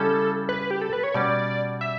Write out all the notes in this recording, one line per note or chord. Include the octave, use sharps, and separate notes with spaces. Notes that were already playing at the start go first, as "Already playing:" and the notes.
Already playing: C#3 G3 C#4 E4 A4
B4
G4
A4
B4
C#5
B2 G3 C#4 D5
E5